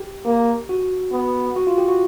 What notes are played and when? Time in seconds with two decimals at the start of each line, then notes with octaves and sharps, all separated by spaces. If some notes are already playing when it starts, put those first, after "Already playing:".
Already playing: G4
0.25 A#3
0.69 F#4
1.12 B3
1.56 F#4
1.67 F4
1.78 G4
1.88 F#4